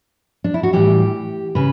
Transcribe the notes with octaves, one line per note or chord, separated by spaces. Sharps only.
D4
E4
F#4
A2 E3 G3 G4
C#3 B4